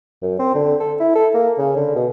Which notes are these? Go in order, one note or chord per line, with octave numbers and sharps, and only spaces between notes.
F#2
C4
D3
A4
E4
A4
A#3
C#3
D3
B2